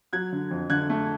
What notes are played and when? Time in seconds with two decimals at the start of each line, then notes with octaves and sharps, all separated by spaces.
0.13 F#3 F#6 G#6
0.33 D3
0.51 F2
0.70 D3 F#6 G#6
0.90 A3